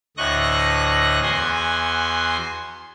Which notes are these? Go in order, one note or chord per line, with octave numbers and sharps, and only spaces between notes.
D2 A2 D#5 C#6 F#6 A#6
E2 F#4 G#5 C6